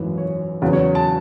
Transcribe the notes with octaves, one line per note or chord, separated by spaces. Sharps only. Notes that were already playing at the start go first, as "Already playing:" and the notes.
Already playing: G#1 F#2 E3 B4
C#5
E2 C#3 F#3 B4
C#5
A5